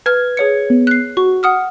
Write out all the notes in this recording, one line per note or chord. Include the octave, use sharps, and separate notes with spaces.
B4 F6 G#6
G#4 C#5 C#7
B3
F#6 C7
F#4 C#6
F#5 D#6 F6